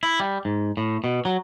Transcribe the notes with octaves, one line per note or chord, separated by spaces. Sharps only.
E4
G3
G#2
A2
B2
F#3